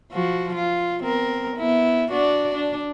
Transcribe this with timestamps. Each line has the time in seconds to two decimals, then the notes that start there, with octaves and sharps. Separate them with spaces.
0.12 F3 F#4
0.56 F4
1.02 B3 C4 A#4
1.57 B3 E4
2.12 D4 F#4 D5
2.55 D4